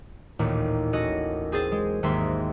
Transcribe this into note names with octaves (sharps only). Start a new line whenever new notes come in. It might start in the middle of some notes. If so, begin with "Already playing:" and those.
A1 D#2 A#2
C#4 F#4 A4 D#5
C4 G#4 C5 A6
G#3
G#1 D#2 G#3 A#3 E5 C6